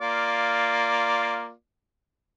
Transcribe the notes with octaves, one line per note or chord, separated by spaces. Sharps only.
A#3 F4 D5